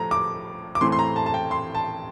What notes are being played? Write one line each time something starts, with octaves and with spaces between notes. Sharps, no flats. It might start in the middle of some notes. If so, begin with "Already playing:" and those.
Already playing: A2 F3 A3 A#5
D6
D6
A2 E3 A3 C4 C6
C6
A#5
A5
A5
G5
C6
A5